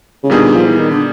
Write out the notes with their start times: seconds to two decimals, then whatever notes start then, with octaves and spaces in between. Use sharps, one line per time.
0.23 C#3
0.30 A#2 D3 G3 B3 D#4 G#4
0.54 F3
0.67 E3
0.79 D#3
0.91 D3